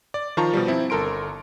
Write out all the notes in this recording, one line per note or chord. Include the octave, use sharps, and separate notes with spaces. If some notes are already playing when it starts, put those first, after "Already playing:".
D5
D#3 F3 F4 A5 A#5 C#6
B2 F3 G3
C4 E4
G1 A4 A#4 C6 D7